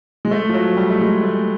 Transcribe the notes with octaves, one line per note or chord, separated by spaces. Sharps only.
G#3
A3
F3
F#3
G3
A3
G#3
A3